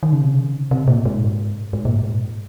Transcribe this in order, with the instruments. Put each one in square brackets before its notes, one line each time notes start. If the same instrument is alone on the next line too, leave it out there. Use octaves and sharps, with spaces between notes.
[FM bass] D#3
C#3
C3
C#3
C3
A#2
G#2
G#2
A#2
G#2